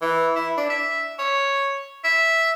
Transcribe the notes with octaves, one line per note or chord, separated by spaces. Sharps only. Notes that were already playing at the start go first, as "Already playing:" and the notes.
E3
E4
D4
E5
C#5
E5